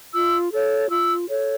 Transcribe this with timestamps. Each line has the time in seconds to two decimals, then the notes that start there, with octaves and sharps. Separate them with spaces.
0.14 F4 E6
0.52 A4 C#5
0.90 F4 E6
1.28 A4 C#5